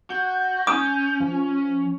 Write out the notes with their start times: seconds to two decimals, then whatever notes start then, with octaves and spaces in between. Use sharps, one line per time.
0.10 F#4 G6
0.67 C#4 D#6
1.20 F3